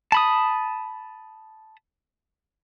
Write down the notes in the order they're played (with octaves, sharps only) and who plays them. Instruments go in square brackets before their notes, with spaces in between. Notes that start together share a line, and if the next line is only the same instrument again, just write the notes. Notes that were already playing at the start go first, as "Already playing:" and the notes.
[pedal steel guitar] A5 B5 D#6